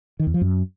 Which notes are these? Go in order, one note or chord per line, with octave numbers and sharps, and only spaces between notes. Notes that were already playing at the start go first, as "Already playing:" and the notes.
D#3
E2
F3
F#2